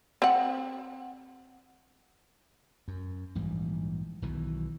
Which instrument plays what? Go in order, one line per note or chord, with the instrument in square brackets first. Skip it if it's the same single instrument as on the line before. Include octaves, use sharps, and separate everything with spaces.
[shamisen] C4 F#5
[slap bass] F#2
A#1 G#2 E3 G3
B1 B2 D#3 E3